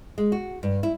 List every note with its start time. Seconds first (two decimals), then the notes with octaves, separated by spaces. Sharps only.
0.18 G#3
0.32 F#4
0.63 G2
0.83 E4